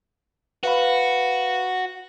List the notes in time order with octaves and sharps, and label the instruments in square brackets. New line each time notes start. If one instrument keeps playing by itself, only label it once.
[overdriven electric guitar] F#4 [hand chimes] B4 F5 B5